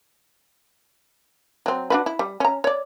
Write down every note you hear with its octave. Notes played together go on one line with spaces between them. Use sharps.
F#3 C4
D4 F#4 B4
E4
G3
C#4 A#5
C#5 D5